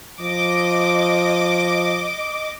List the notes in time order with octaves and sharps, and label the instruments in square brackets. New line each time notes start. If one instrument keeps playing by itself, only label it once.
[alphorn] F3 [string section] D#5 D6